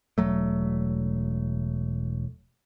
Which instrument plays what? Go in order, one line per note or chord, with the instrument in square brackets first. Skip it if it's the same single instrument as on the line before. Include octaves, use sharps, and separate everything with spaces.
[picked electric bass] E1 F#3 A3